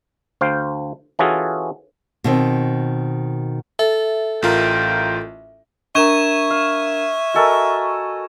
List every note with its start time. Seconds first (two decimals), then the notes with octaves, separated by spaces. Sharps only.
0.41 D2 C5 F5 G5
1.19 E3 C#4 F4 F#4 G#4 A4
2.24 B2 D#3 C4
3.79 A4 E5
4.42 A1 F4 A#4 G5
5.95 D4 A#4 E5 A#5 C#6 G#6 E7
6.50 F5
7.34 F#4 A4 A#4 D#5 G#5 E6